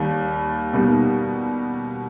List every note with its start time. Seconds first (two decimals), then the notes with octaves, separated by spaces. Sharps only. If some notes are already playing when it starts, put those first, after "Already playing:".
Already playing: D#2 D#3 G3
0.73 B2 G3 A#3 D#4